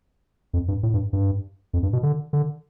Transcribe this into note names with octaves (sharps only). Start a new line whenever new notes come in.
F2
G2
A2
G2
G2
F2
G2
B2
D3
D3